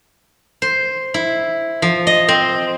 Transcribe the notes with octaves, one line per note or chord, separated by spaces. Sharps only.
C5
E4
F3
D#5
C4